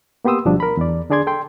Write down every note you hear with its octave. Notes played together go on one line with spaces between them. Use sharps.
A#3 B3 G4 C6 D#6 E6
D2 B2 F3 G3 D4
A#4 B5
E2 D5
D3 D4 G#4 D5 C6 G#6
A4 G5 C6